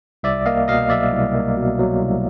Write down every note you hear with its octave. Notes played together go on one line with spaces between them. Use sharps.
C2 D5 E5
A#3 D#5 F5
B2 D#5 F5
F#3 D5 E5
C2
A#3
B2
F#3
C2